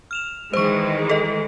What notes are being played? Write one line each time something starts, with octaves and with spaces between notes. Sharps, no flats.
F6 E7 F7
D#3 E3 G#3 C5 C#6
A4 D#5